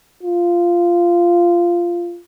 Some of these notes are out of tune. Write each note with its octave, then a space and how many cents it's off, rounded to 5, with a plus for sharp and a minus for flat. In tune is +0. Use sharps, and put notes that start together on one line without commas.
F4 -10